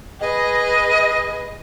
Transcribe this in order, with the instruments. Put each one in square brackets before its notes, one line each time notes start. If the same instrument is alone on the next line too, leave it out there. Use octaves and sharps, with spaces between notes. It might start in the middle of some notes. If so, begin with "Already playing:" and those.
[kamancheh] G#4 B4 [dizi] D#5